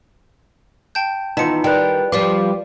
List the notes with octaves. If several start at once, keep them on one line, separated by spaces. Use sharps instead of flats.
G5 A5 G6
D#3 E3 B3 D#4 F4 A5 C#7
D#3 G3 F4 B4 G5
F3 G3 G4 B4 D5 F5 D6